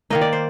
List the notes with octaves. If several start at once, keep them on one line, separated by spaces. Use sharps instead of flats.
D#3 A#3 D#4 D#5
D5
C5